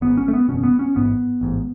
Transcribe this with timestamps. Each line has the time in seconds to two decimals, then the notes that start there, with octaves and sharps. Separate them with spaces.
0.01 G#1 G#2 B3
0.17 C#4
0.28 A3
0.33 B3
0.48 F#1 E2 B2 C#4
0.63 B3
0.79 C#4
0.95 A1 G#2 B3
1.41 A1 G#2